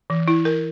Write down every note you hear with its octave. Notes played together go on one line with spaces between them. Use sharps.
E3
E4
A#4